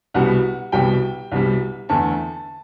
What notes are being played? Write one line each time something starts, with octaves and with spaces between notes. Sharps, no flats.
C2 B2 G3 F#5
C2 B2 G3 G5
C2 B2 G3
E2 D3 A3 A5